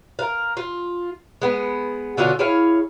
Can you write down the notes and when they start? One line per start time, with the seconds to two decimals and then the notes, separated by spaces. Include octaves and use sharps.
0.19 A#4 F5
0.57 F4
1.42 G#3 B3
2.17 B2 D3 C#4 F4
2.39 E4 G#4 C#5 F5